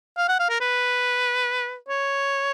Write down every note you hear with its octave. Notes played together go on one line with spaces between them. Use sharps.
F5
F#5
F5
A#4
B4
C#5